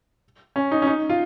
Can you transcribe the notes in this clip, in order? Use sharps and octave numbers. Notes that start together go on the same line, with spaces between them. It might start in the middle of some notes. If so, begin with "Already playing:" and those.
C#4
D#4
C#4
D#4
F4